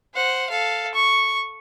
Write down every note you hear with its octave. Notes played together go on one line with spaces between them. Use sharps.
C5 F#5
A4 F5
C#6